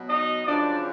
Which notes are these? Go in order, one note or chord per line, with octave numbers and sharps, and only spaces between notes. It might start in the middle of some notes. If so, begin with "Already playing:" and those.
Already playing: B2 F#3
D#4 D#5
F#2 C#3 F3 D4 D5